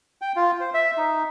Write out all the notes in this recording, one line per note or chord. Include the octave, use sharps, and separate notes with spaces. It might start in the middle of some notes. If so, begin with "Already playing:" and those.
G5
F4
C5
E5
D#4